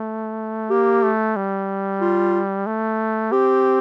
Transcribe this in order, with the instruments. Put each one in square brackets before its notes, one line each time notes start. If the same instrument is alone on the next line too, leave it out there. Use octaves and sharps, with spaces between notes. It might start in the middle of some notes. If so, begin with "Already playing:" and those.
Already playing: [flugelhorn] A3
[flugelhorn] A#3 [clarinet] G4
[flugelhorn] A3
G3
[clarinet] F4
[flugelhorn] A3
[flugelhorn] C4 [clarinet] G4